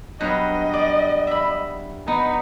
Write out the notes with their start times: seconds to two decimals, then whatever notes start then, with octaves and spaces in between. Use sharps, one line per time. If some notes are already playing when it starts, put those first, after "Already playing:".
0.21 G2 F#3 B3 D#5
0.73 D5
1.27 E5 B5
2.08 B3 D#4